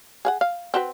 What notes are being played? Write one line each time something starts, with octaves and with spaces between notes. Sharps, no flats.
G#4 F5 F#5
F5
C4 F#4 B4